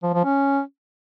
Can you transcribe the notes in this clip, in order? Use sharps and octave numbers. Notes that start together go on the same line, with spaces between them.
F3
F3
C#4